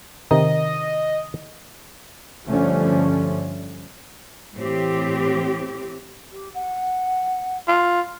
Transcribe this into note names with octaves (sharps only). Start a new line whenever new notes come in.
C3 D#3 D#4 D#5
G2 D3 F3 A3 C#4
A2 E3 C4 G4
G4
F#5
F4